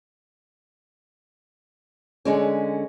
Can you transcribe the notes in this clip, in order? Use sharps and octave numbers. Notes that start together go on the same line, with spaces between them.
D3 G#3 C#4